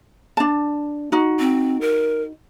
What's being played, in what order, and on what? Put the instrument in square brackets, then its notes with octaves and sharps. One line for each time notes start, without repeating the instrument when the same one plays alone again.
[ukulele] D4 A5
D#4 F#4
[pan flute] C4
A#4